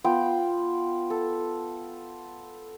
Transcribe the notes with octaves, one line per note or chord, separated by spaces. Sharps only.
B3 F4 G5
A4